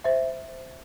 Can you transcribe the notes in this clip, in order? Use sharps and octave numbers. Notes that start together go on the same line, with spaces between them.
C5 E5